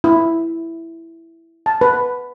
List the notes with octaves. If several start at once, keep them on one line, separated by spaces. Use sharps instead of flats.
E4
A5
B4